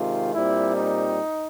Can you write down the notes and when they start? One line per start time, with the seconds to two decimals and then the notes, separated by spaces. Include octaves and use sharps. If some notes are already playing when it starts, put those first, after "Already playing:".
Already playing: C3 D#3 G#3 F4
0.34 A#2 G3 C4 E4
0.77 D#4